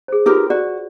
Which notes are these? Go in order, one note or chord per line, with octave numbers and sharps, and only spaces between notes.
G#4 C5
D#4 F4 G4 A#4 B4
F#4 D5